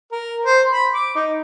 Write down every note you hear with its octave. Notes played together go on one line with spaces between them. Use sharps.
A#4
C5
B5
D6
D#4